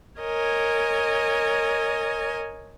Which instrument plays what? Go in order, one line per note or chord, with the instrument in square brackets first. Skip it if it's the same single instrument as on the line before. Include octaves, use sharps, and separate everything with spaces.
[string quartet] A#4 C#5 D#5 G#5